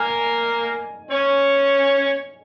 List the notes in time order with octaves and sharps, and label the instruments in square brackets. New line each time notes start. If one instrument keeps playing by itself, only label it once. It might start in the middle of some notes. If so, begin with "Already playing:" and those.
Already playing: [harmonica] A#3 A#4 [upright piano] G#5
[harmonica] C#4 C#5